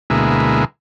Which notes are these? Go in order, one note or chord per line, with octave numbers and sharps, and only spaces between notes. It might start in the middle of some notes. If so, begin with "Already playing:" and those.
D2 B2 G#3 A#3 E4